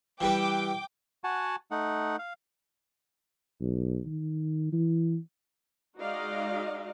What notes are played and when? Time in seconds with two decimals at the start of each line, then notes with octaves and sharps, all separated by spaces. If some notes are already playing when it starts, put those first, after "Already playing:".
0.21 E3 G3 B4 G5 D6
1.24 F#4 F#5 G#5 A5
1.71 A3 D#4 F#5
2.19 F5
3.61 B1
4.06 D#3
4.73 E3
5.99 G#3 D#4 F#4 D5 D#5 F5